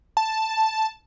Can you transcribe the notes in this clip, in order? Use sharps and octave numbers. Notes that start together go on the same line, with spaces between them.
A5